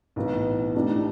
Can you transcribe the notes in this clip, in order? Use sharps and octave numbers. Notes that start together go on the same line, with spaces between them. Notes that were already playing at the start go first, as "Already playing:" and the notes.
B1 A2 E3 B3
B1 A2 A3 D4 G4